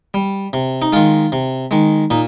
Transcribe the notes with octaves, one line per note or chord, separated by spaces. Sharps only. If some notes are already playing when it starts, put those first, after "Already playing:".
G3
C3
D#4
D#3 G#3 F4
C3
D#3 G#3
A#2 D#4